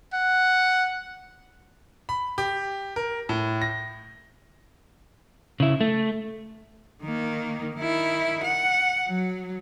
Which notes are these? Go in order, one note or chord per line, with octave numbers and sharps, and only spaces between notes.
F#5
B5
G4
A#4
A2
A#6
C#3 E4
A3
D#3 A#3
D#3 E4
F#5
F#3